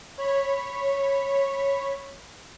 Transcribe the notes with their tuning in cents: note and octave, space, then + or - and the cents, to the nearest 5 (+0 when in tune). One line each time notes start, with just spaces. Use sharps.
C#5 -10 B5 +0